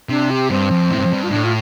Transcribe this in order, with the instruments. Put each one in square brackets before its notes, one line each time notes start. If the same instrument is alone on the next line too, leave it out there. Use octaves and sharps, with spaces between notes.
[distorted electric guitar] C3 [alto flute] D4
[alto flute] G4
[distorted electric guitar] G2 [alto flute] C4
[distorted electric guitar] F2
A2
G2
F2
G2
[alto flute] F4
[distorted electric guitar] A2 [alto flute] D4
[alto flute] F4